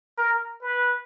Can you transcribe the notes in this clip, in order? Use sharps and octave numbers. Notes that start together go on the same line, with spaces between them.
A#4
B4